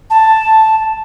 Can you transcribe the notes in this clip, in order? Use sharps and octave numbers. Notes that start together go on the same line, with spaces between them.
A5